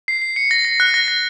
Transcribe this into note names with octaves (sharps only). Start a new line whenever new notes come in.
C7
C7
C#7
A#6
A#6
F#6
A#6
A#6